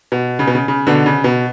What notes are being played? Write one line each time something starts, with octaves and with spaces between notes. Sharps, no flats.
B2
C#3
B2
C#3
C#3
B2 D3
C#3
B2